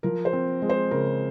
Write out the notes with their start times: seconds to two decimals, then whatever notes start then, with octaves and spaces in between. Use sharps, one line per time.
0.03 F3 A#4
0.25 C5
0.33 C4
0.62 G#3
0.69 C5
0.91 C#3 A#4